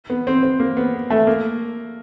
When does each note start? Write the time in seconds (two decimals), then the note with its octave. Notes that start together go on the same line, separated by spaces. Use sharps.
0.10 B3
0.27 C4
0.43 C4
0.60 A#3
0.77 B3
1.10 A3
1.27 A#3